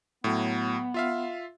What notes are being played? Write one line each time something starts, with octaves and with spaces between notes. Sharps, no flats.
A2 F#3 B3
F4 E5 F5